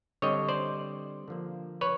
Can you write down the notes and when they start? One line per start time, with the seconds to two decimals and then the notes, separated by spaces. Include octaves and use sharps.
0.22 D3 G3 C4 C#5 D#5
0.49 C5 D5
1.28 D3 F3 A#3
1.81 B4 C#5